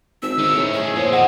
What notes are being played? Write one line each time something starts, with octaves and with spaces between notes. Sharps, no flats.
G#1 E6
G#2 D#3 C#4
A2
G#4
A#2 F3 C#5
B2 C4 D#5 F#5